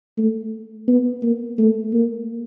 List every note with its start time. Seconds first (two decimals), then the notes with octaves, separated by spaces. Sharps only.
0.18 A3
0.88 B3
1.23 A#3
1.59 A3
1.93 A#3